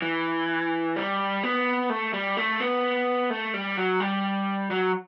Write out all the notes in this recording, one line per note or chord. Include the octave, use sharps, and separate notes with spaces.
E3
G3
B3
A3
G3
A3
B3
A3
G3
F#3
G3
F#3